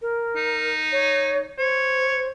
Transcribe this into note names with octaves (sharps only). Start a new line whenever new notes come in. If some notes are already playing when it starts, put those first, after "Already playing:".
A#4
D#4
C#5
C5 C#5